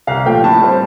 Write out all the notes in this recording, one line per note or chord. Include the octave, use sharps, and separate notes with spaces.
C2 F5
A#2 F3 A3 G5
A2 A5
G3 C4